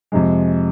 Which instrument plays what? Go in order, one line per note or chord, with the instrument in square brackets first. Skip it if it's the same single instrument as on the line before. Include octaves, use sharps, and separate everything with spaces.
[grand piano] F2 C3 G#3